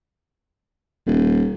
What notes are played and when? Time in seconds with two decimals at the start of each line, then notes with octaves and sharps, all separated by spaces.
1.06 D#1